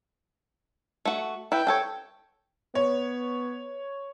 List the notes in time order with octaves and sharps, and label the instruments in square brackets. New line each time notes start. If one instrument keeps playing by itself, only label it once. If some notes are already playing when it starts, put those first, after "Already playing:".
[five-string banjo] A3 F#4
[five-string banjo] E4 B4 [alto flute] G5
[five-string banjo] D4 A4 C#5
[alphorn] B3 [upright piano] C#5